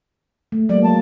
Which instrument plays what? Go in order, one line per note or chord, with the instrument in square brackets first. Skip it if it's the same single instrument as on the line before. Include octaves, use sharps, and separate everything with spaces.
[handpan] A3
[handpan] F#3 G#3 A#3 [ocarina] D5
[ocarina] A5